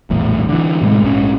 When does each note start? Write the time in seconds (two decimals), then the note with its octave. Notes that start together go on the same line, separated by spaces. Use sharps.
0.10 A#1 E2 A2
0.49 D3 E3
0.82 A2 C3 G#3
1.03 A#1 G#2 D3 C#4